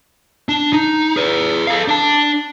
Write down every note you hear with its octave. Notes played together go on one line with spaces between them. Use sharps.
D4
D#4
G#4 B4
A4 F5
D4 A5